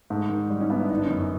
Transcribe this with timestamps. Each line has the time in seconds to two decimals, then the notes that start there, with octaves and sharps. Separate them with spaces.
0.10 G#2 A3
0.29 D#3
0.50 G3
0.60 C#4 D#4
0.70 B3 D4 E4
0.80 D4 E4
0.90 G1 D#4
0.97 D4
1.05 C#4 D#4
1.10 F#2